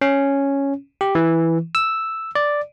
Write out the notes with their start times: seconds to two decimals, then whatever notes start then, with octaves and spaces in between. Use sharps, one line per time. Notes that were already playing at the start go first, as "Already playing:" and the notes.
0.01 C#4
1.01 G4
1.15 E3
1.75 E6
2.35 D5